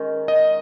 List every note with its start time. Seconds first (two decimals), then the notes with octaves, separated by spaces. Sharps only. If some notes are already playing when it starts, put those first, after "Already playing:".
Already playing: D#3 G#3 C#4
0.28 D#5